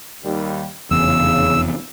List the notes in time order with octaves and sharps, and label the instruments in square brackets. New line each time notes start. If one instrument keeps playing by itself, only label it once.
[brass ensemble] D#2 G3
[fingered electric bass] F1 E2 [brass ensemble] C#3 [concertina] E6